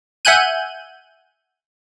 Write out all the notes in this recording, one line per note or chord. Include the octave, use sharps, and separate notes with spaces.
E5 F#5 G#5 F#6 G6 D#7